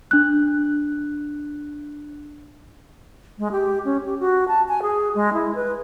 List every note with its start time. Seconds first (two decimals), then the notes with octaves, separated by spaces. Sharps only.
0.11 D4 F#6
3.39 G#3
3.52 G4
3.85 C#4
4.06 G4
4.20 F#4
4.48 A5
4.69 G#5
4.82 G#4
5.15 G#3
5.33 E4
5.55 B4